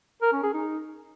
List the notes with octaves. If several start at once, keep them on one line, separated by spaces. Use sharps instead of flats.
A#4
C#4
G#4
D#4